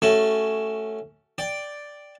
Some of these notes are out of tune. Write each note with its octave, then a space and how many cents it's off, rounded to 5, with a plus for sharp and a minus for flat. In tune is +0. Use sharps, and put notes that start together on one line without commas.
A3 +0 C#4 +0 F#4 +35
D5 +0 G5 +0